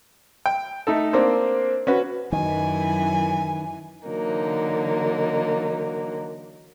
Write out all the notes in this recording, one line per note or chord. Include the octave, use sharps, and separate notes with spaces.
G5
A3 D#4 A4
A#3 C4 D4 C5
C#4 F#4 B4
F#2 D#3 E3 G#5
D3 E3 F#3 A#3 D#4